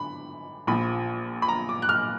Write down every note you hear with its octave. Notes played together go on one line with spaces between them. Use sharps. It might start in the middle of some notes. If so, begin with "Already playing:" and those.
Already playing: D3 B5
A#1 A#2 F3 B5
B5
A#5
D6
F#6
F6